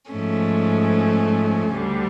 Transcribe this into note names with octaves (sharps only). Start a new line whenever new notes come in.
G#2 F3 A3 C#4
D2 D3 G3